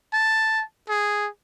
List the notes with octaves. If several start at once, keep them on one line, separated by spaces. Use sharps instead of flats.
A5
G#4